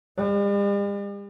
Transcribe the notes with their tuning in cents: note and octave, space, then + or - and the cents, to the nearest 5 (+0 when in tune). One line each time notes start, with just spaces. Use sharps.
G3 +45